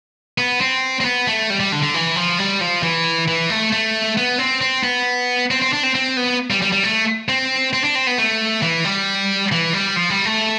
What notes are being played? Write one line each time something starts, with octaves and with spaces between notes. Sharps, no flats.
B3
C4
C4
B3
A3
G3
G3
D3
D3
E3
F3
G3
F3
E3
E3
A3
A3
B3
C4
C4
B3
C4
C4
D4
C4
C4
B3
G3
G3
G3
A3
C4
C4
D4
C4
B3
A3
E3
G3
E3
G3
F3
G3
A3